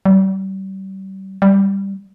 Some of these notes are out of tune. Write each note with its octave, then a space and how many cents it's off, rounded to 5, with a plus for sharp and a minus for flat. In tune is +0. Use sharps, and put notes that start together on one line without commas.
G3 -35
G3 +5